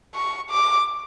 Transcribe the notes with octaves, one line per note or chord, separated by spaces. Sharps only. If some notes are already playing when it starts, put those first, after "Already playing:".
C#6
D6